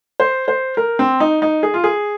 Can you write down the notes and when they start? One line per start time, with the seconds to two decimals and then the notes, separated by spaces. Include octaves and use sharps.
0.20 C5
0.48 C5
0.77 A#4
0.99 C4
1.20 D#4
1.42 D#4
1.63 G#4
1.74 F4
1.84 G#4